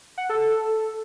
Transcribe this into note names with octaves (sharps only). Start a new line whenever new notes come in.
F#5
A4